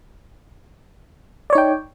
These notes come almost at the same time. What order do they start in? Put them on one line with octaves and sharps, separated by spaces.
D5 C#5 D#4 G5